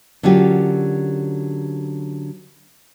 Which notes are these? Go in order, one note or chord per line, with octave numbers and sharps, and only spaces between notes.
D3 F#3 A#3 C#4 F4 G4